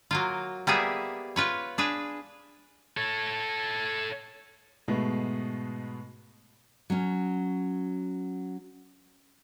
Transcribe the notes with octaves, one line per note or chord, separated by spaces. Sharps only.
F#3 A#3 F4
G3 A#3 B3 G#4 E5 G#5
F4 B4 C#5
D4 G#4 B4
A4 C#5
G#2 B2 G#3 A3 B3
F#3 C#4